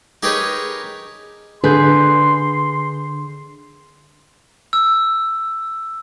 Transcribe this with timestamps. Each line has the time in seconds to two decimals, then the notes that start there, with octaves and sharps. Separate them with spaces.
0.23 D#4 G4 G#4 A#4 B4 C#5
1.64 D3 D4 G#4 B4 C6 G6
4.73 E6